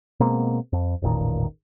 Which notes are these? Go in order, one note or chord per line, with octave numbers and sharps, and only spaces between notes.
B2 G#3 A#3 C4
F2
E1 A1 A#2 D#3